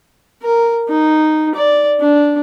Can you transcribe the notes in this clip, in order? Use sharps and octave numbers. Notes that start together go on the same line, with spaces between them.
A#4
D#4
D5
D4